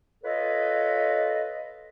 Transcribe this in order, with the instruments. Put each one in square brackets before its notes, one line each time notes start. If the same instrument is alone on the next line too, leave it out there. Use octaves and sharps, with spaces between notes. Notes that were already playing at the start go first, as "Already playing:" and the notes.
[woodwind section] F4 A4 B4 C#5 D#5